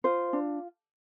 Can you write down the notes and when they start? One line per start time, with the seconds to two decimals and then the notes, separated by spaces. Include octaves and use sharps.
0.04 F4 C5
0.33 D4